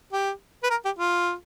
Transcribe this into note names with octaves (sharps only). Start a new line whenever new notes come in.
G4
B4
A#4
G4
F4